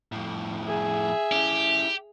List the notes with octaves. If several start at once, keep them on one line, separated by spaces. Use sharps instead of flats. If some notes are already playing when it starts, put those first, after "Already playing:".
F2 A2
G#4 E5
C#4 E4 G4